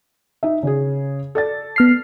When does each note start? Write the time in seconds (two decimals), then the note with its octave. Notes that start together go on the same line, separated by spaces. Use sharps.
0.43 D#4 E5
0.63 C#3 C#4 G#4
1.35 A4 D5 A6
1.76 B3 F6 C7